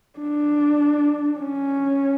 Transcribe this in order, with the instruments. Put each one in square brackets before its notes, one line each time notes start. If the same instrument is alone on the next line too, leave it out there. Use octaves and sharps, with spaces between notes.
[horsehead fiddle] D4
C#4